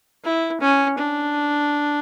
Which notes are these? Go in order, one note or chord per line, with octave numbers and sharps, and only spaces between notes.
E4
C#4
D4